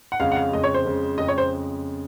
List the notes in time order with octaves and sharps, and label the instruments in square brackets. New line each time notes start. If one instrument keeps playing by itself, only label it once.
[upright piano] F#5
[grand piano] F2 C#3 G#3 [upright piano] F5
[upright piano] F#5
F5
[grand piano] F2 C#3 G#3 [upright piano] D#5
[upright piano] C#5
C5
[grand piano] F2 C#3 G#3
[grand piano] F2 C#3 G#3 [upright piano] D#5
[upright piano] C#5
C5